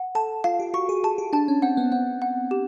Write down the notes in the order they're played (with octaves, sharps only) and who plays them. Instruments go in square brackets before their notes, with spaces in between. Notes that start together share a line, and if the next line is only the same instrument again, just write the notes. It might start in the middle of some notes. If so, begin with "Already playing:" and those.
Already playing: [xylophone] F#5
[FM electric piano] A4 [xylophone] A5
[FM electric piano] F4 [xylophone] F5
[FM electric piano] G4
[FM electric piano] F#4 [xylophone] C#6
[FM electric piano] G#4
[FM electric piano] G#4 [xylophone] A5
[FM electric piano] G4
[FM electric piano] D4 [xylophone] A5
[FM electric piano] C#4
[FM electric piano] C4 [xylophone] F#5
[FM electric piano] B3
[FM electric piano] C4 [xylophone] F#5
[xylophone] F#5
G4